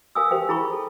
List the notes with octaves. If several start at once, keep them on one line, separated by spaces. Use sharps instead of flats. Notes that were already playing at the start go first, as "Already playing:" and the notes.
A#4 F5 G#5 D#6 E6
G4 A#4 C5 F5 G5
E4 G#4 A#5 B5 C#6
A4